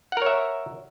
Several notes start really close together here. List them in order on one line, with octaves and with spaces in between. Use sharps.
F#5 A#4 C#5 E5